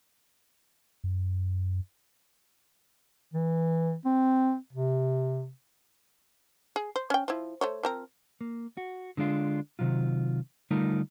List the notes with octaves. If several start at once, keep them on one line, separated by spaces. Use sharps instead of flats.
F#2
E3
C4
C3
G#4
C5
C#4 G5
F3 E4
A3 C5 C#5
F3 C4 A#4
A#3
F#4
D3 G#3 D4 F4
C3 D#3 F#3 F4
D3 G3 A3 D#4 F4 A#4